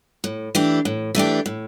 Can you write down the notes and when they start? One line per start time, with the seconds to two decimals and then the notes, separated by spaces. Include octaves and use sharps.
0.24 A2
0.55 E3 A3 D4 G4
0.85 A2
1.15 E3 A3 D4 G4
1.46 A2